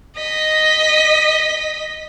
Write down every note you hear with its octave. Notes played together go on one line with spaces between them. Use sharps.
D#5 B6